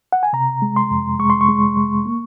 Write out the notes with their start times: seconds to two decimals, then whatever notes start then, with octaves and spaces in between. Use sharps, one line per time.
0.12 F#5
0.23 G#5
0.33 C3 A#5
0.62 G#3
0.76 C6
0.91 F2
1.19 G#3 C#6
1.30 C6
1.41 C#6
1.48 G#3
1.77 G#3
2.06 A#3